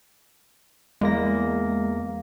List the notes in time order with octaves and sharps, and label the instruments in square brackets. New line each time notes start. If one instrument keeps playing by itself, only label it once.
[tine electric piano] E2 A#3 A#6 [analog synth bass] G#3